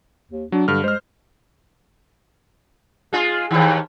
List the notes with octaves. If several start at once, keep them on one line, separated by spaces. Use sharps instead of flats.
D#2
F#3 D4
G2 D3 F6
G#3 C5 F6
G#3 F4 G#4
D#2 G#2 D#3